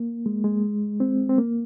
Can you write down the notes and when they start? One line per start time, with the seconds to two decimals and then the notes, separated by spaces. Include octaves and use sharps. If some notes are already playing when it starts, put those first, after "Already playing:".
Already playing: A#3
0.26 G#3
0.44 G#3
1.00 C4
1.29 C4
1.38 A#3